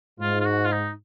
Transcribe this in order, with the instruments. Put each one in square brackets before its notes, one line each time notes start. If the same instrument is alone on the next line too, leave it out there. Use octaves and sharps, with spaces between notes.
[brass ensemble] G#2 [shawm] F4
[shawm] F4
F#4
F4
D#4